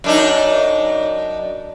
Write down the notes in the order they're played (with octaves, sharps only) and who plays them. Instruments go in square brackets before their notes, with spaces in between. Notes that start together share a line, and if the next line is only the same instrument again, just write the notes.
[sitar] F#2 D4 D#4